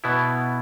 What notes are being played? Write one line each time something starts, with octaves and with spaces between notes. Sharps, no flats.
B2 B3 E4